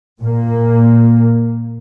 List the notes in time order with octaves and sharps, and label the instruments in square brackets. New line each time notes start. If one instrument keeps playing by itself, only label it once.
[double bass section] A#2 A#3